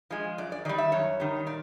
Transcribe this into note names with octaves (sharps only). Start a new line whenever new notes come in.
F3 G#3
F#2 D5
D5
D#3 G3 D5
E5
F#2 C#5
D#3 G3
A#2 D5